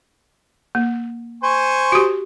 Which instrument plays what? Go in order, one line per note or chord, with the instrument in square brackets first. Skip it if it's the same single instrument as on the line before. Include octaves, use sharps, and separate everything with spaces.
[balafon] A#3
[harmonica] C5 G#5 C#6
[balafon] F#4 G4